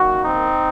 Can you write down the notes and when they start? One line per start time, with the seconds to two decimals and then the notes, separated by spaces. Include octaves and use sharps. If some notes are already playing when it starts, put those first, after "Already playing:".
Already playing: F#2 D#3 A#3 F#4
0.23 C4 D#4